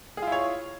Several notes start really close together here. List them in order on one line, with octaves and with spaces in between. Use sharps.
G#4 F4 E4 C#5